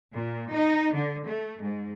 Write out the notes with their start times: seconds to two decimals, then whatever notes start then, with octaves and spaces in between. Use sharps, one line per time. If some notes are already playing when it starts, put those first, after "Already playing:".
0.12 A#2
0.51 D#4
0.93 D3
1.24 A3
1.60 G#2